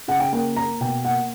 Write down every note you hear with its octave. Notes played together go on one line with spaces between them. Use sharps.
C#3 F#5
G5
A#3 G5
A#3 A#5
B2 G5
A#3 F#5